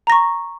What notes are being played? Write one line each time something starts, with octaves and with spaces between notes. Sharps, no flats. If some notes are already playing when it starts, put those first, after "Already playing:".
A#5 C#6 A#6